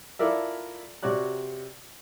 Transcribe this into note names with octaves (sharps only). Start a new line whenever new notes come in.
E4 F4 A4 A#4 D5 E5
C3 F#4 C#5 D5 F#6